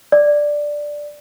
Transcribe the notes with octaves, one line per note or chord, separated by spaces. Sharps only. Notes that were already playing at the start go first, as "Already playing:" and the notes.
D5